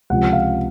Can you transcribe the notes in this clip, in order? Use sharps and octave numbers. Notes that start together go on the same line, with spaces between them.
C#2 C3 F3 F#5
F5